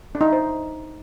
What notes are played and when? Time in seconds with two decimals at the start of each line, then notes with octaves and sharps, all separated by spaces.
0.15 D4
0.21 D#4
0.27 E5
0.32 C5